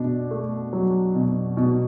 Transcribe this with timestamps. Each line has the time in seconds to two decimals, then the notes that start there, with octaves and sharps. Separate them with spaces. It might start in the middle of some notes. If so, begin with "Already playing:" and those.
Already playing: B2 D4
0.31 A3
0.73 F#3
1.15 B2
1.57 B2